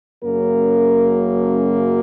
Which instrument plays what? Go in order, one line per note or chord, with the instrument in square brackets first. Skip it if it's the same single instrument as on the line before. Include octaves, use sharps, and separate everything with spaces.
[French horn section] F#2 C#3 F#3 A#3 A#4